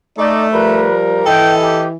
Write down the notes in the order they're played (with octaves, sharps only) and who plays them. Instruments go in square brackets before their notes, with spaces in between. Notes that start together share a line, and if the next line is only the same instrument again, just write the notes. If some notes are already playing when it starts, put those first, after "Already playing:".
[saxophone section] A3 [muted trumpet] D#4 [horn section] D5
[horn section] F3 G3 A#4 [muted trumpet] B4
[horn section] E3 [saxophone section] A4 D#5 [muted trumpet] G5
[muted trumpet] G4